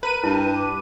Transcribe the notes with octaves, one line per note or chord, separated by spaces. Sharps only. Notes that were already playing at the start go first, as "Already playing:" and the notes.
A#4 B4 D#7
G2 E4
D4